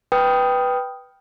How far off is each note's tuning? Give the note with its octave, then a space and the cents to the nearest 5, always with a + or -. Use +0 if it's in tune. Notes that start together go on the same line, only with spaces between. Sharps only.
B4 +0 G5 +0 D#6 +0